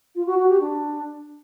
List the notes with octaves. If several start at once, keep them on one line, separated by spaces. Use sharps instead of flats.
F4
F#4
F#4
G4
D4